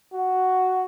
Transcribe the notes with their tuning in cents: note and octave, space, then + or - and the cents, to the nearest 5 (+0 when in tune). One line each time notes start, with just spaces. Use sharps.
F#4 +5